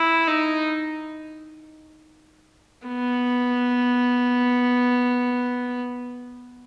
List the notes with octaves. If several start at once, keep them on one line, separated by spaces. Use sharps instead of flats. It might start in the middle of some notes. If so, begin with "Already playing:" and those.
Already playing: E4
D#4
B3